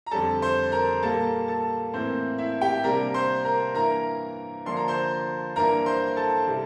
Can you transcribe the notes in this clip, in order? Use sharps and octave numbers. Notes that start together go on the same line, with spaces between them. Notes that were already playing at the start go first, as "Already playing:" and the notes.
A#5
F2 D3 G3 A4 A5
C5 C6
A#4 A#5
A#2 G3 A#3 A4 A5
A4 A5
A2 E3 A#3 C4 C5
E4 E5
G4 G5
C3 G3 A#3 D4 A#4 A#5
C5 C6
A#4 A#5
G2 E3 A#3 E4 A#4 A#5
D3 F3 A#3 D4 C6
A#5
C5 C6
G2 E3 A#3 D4 A#4 A#5
C5 C6
A4 A5
C3 G3 C4 E4